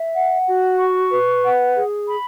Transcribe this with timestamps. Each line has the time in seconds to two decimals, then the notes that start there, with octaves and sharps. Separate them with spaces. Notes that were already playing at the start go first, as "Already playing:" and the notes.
Already playing: E5
0.15 F#5
0.47 F#4
0.79 C#6
1.11 B4
1.43 F#5
1.76 G#4
2.08 B5